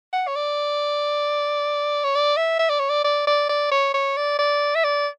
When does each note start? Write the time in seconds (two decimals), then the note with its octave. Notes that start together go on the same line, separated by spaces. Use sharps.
0.13 F#5
0.27 C#5
0.36 D5
2.04 C#5
2.15 D5
2.37 E5
2.59 E5
2.69 D5
2.80 C#5
2.89 D5
3.04 D5
3.27 D5
3.49 D5
3.71 C#5
3.94 C#5
4.17 D5
4.39 D5
4.75 E5
4.84 D5